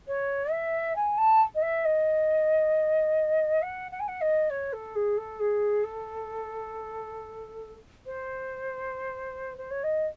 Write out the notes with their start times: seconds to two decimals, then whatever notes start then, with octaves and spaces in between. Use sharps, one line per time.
0.07 C#5
0.51 E5
0.95 G#5
1.17 A5
1.55 D#5
1.62 E5
1.85 D#5
3.62 F#5
3.91 F#5
3.99 G#5
4.08 F#5
4.21 D#5
4.50 C#5
4.72 A4
4.95 G#4
5.17 A4
5.39 G#4
5.83 A4
8.05 C5
9.57 C5
9.70 C#5
9.83 D#5